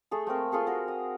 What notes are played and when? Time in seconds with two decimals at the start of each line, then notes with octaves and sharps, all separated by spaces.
0.11 A3 G#4 A4
0.27 A3 A#3 C4 A#4
0.52 F4 G#4 A4 C6
0.67 F#4 A#4
0.88 D#6